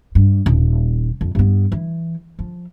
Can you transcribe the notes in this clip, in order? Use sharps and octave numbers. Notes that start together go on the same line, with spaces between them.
G2
D#1
F2
G2 B3
E3
F3